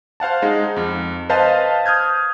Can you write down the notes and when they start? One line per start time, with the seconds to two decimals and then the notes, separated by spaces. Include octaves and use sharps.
0.20 C5 F5 F#5 A5
0.42 G#3 D#4
0.76 F2
1.29 B4 C5 D#5 F5 A5
1.86 D#6 F6 G6 G#6